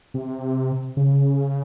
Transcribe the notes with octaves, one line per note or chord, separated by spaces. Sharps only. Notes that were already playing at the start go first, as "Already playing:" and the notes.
C3
C#3